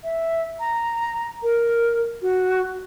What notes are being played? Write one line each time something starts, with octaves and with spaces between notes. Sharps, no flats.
E5
A#5
A#4
F#4